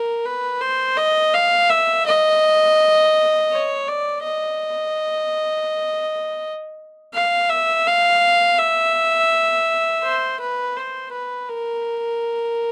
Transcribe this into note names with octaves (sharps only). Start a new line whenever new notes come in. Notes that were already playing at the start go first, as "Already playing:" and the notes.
Already playing: A#4
B4
C5
D#5
F5
E5
D#5
C#5
D5
D#5
F5
E5
F5
E5
C5
B4
C5
B4
A#4